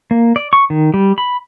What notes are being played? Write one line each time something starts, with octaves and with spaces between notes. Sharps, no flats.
A#3
D5
C#6
D#3
G3
B5